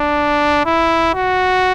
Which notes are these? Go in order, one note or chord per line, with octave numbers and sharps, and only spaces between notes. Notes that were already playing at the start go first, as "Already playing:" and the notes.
Already playing: D4
E4
F#4